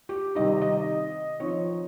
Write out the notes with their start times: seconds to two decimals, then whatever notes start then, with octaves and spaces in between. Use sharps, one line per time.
0.09 G4
0.35 C3 D#3 G3 C4 D#4 D#5
0.62 D#5
1.40 F3 C4 D#4 C#5